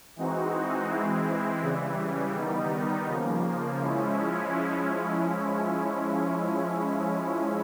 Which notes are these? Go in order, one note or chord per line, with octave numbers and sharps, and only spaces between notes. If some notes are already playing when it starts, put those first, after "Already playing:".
E3 G#3 C4 D#4 F#4
E3 G#3 C4 E4
C#3 E3 G3
D#3 G3 B3 D#4
C#3 F3 A#3
F3 G#3 C#4 E4